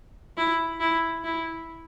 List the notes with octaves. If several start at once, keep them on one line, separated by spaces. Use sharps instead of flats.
E4
E4
E4